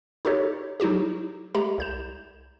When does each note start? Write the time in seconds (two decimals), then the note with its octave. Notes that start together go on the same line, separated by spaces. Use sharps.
0.25 D#4 F#4 G4 A4 C#5
0.80 F#3 D#4 E4 F#4 G4
1.54 G#3 A3 G4 A#5 B5
1.78 C2 G6 E7